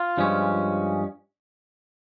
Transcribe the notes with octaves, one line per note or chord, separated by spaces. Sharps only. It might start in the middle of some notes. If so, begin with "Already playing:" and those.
Already playing: F4
G2 F3 G#3 C#4